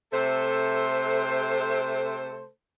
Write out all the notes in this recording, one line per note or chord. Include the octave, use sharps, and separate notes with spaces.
C3 A3 A4 C5